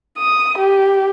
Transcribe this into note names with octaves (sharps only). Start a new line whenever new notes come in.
D#6
G4